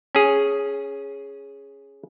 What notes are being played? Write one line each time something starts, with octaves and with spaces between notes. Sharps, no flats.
C#4 G#4